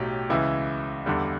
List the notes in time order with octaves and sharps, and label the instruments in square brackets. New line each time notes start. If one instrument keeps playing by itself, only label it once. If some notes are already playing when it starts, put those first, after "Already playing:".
Already playing: [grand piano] B1 A2 F#3 G4
C#2 C#3 E3 E4
E2 D3 G3